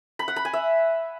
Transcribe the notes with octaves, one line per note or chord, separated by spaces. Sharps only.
B5
F#5
B5
G#5
E5